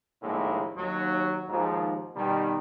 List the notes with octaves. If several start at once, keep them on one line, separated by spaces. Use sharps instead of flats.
A#1 D#2 A2 C#3 G#3 A#3
D#2 F#3
D#2 G#2 F3
B2 D#3 G3